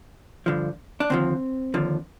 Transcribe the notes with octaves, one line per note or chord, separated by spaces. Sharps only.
G2 D3 F3
D4
D#2 D3 F3 C4
D#2 D3 F3